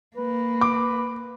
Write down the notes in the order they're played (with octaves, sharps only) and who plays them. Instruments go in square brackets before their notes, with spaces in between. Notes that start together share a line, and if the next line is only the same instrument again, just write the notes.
[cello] A#3 [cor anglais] B4
[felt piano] D6